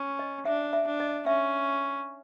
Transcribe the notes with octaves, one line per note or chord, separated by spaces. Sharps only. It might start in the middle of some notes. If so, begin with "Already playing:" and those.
Already playing: C#4
D#5
D4 E5
E5
D4
D#5
C#4 E5